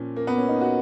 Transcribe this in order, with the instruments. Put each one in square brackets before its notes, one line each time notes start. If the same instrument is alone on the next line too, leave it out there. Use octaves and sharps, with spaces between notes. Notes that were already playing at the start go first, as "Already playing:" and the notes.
Already playing: [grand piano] A#2 F3 C#4
A#3
B3
C#4
D#4
F#4